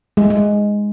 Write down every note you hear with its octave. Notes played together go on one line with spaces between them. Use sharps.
G#3
G#3